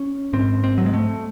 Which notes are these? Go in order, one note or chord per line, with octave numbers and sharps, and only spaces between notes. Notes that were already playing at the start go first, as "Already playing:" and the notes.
Already playing: C#4
G#2 C4
C4
F#3
G#3
A3